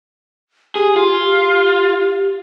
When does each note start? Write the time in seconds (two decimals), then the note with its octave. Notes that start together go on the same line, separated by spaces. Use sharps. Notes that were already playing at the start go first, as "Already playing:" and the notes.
0.75 G4 G#4
0.96 F4
1.20 G4